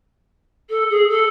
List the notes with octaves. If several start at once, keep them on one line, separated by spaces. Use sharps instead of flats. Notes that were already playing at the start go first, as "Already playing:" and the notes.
A4
G#4
A4